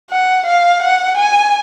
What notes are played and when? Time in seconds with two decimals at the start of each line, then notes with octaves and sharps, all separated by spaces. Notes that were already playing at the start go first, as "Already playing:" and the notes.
0.10 F#5
0.46 F5
0.82 F#5
1.17 G#5